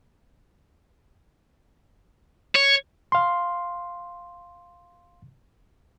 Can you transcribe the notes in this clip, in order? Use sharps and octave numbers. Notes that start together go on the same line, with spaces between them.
C#5
F5 C6